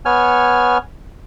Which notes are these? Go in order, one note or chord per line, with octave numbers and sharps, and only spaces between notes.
B3 C#5 G#5 F6